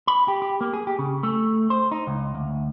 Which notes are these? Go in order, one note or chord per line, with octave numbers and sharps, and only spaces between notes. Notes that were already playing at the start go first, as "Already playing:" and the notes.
B5
G4
G4
A#3
G#4
G4
C#3
A3
C5
D#4
C#2
D2